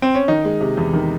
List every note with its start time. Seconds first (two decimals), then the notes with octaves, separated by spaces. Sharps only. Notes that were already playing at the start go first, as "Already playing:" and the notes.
0.02 C4
0.15 C#4
0.28 D#3 D#4
0.44 G#3
0.60 C3
0.77 E2
0.93 D#3